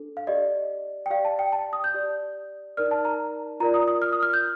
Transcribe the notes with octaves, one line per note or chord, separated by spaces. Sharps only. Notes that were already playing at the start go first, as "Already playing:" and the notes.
Already playing: D4 A4
F5
G4 D5 D#5
G5
G4 D5 F5
A5
G5
A5
D#6
G6
G4 D5
D#4 A#4 D5 F6
A5
A#5
F4 A#4 D5 A#5
D#6
D#6
F6
D#6
F6
G6